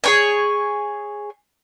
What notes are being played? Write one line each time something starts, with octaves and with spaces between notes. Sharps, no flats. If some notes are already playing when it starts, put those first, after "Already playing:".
G#4 C#5 G#5